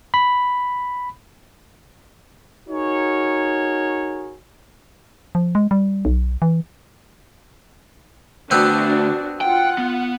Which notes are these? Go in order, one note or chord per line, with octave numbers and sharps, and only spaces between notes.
B5
D#4 F#4 G#4 A#4 C#5
F3
G#3
G3
B1
E3
D3 A3 B3 C4 D4 F#4
F4 F#5 G5
B3